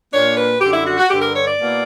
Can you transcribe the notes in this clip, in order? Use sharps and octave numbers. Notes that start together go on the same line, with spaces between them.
A#2 A#3 D4 C#5
B4
F#2 D3 G3 G4
E4
F#4
F#4
G2 D3 G3 G4
A#4
C#5
D5
B2 A#3 E4